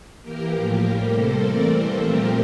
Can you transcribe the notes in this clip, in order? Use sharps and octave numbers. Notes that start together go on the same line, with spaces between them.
E3 A#3 G4 A#4
A2 F3 A#3
A2 G3 A#3 G4 A#4
C3 G3 A#3 A4 C5
E3 A3 C4 A#4 D5
E3 G3 A#3 A4 C5
A#2 F3 A3 C4 G4 A#4